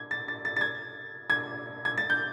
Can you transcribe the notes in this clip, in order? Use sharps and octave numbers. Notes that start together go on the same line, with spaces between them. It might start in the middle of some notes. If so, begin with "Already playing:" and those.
Already playing: G#6
A6
A6
A6
A6
G#6
G#6
G#6
A6
G6